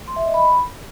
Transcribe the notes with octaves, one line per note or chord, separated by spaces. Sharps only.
C6
E5
D#5
B5